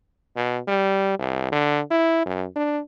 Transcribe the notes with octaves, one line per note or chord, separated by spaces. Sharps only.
B2
G3
C2
D3
E4
F#2
D4